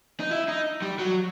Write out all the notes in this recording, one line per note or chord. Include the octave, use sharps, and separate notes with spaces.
D#4
E4
D#4
G3
F#3